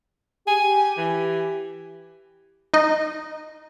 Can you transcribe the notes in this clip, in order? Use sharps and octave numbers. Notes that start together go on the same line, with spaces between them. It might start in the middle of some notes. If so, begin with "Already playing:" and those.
G4 G#5
E3
D#4 D#5